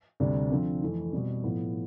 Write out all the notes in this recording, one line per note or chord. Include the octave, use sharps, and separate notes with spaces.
D2 C3 G3 D4
D3 F3 C4
F2 E3 A3 E4
B2 G3 C4
A2 F3 B3 E4